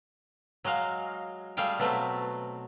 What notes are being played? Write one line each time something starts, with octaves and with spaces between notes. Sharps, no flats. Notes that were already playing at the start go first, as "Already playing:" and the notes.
F#3 G#3 D#5 F5
G3 A3 G#4 F5 G5
B2 F#3 A3 C4 B4